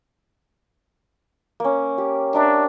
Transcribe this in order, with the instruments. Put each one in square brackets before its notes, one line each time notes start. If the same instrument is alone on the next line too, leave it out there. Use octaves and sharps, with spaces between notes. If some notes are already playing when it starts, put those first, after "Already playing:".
[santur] A#3 C#4
G4
[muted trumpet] D4 [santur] A#4 E5 A#5